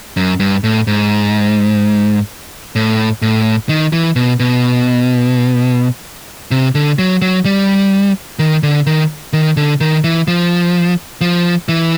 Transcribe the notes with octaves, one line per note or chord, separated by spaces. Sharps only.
F#2
G2
A2
G#2
A2
A2
D#3
E3
B2
B2
C3
D3
F#3
F#3
G3
D#3
D3
D#3
D#3
D3
D#3
E3
F3
F3
E3